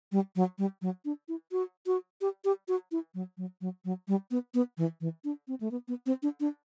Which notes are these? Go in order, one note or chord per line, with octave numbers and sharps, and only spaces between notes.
G3
F#3
G3
F#3
D4
E4
F#4
F#4
G4
G4
F#4
E4
F#3
F#3
F#3
F#3
G3
B3
B3
E3
E3
D4
C4
A3
B3
B3
C4
D4
D4